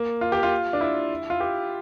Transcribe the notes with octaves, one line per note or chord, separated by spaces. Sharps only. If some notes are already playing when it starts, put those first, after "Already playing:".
Already playing: A#3
F4
G4
F4
D4
E4
F4
G4